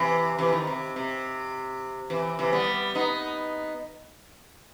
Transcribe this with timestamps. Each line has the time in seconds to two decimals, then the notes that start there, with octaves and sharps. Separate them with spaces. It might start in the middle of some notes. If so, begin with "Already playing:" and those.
Already playing: C3 E3
0.38 C3 E3
0.53 D#3
0.67 C3
0.96 C3
2.10 C3 E3
2.39 C3 E3
2.53 G3 B3
2.95 B3 D#4